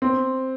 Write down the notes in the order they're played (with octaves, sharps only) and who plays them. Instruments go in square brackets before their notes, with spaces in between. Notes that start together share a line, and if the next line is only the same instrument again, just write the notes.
[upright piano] C4